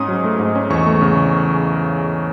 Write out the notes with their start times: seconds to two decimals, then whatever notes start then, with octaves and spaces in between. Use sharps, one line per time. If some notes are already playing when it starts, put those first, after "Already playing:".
Already playing: G#2 C#4 D#6
0.08 F#3
0.24 A3
0.40 G#2
0.55 C#4
0.70 E2 C#6
0.86 A3
1.02 C#3